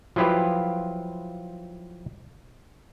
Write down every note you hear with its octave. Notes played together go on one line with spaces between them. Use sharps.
F3 F#3 E4 F4 G4 B4